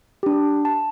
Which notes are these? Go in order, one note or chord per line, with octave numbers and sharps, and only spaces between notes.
D4 G4
A5